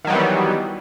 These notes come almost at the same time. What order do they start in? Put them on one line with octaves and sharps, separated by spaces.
D#3 F#3 G3 E3 B3